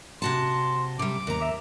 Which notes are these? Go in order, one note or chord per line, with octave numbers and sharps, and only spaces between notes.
C3 F#4 A5 C6
C3 G3 D6
D#2 A#5
E5